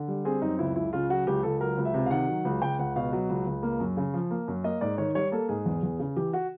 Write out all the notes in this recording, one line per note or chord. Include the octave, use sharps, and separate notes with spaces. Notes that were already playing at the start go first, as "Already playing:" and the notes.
Already playing: D3
G3
C4 G#4
F#2 D#4
C#2 E4
C#2 E4
C#3 F4
F#3 F#4
C#2 G4
C#2 A4
F#3 A#4
C#2
E5
C3
F5
D#3 F#5
F#3
C#2
C#2 G5
C#2 F#5
B2 F5
F#3
C#2
C#2
A#3
F#2
C#3
F3
A#3
F#2
A#3 D#5
G#2 D5
D#3 C#5
G3 C#5
A#3 A4
G#2 G#4
E2
E2
C#3
E3 G4
F#4